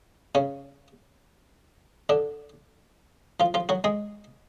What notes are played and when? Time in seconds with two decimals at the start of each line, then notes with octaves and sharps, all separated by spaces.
0.35 C#3 C#4
2.09 D3 D4
3.40 F3 F4
3.54 F3 F4
3.69 F#3 F#4
3.84 G#3 G#4